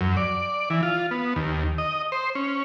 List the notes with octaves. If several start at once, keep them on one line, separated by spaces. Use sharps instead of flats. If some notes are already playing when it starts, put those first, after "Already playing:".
F#2
D5
E3
F4
B3
D#2
D#5
C5
C#4